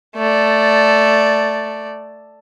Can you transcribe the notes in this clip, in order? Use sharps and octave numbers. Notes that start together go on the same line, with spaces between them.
A3 D5